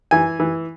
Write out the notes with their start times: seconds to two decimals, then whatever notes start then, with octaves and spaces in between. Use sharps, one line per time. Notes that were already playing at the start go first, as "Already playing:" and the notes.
0.11 E3 G#5
0.40 E3